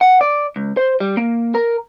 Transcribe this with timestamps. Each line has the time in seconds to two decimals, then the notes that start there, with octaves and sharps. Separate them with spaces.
0.01 F#5
0.21 D5
0.56 C#2
0.77 C5
1.00 G3
1.17 A#3
1.55 A#4